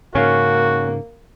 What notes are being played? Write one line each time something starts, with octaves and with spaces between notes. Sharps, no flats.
G#2 C#3 A#3 C#4 F#4 F5